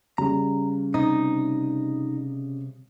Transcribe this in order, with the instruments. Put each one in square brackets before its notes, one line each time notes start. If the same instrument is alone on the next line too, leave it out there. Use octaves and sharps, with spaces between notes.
[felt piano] C#3 G3 [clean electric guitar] A#5
[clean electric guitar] C3 D#5 [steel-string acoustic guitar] D#4